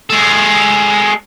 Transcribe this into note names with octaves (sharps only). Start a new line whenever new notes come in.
G#3 A4